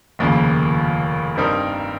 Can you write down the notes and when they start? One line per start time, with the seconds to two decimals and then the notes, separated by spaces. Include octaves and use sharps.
0.19 F1 D#2 C#3 F3 A#3
1.36 G2 G3 C4 D#4 A#4